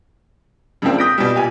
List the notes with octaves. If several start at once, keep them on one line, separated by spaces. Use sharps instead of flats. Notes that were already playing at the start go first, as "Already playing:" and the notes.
F2 C#3 F3 A#3 C4 D4
D#6 G6 A#6 B6 D7
B2 G3
A#2 G4 G#5